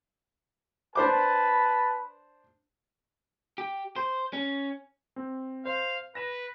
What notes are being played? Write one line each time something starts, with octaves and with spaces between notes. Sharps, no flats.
D4 B4 C5 A5 D6
G4
C5
C#4
C4
C5 F5
B4 A#6 E7